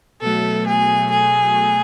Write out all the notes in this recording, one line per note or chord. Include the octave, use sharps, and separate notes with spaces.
B2 F#3 A3 A4
G#4
G#4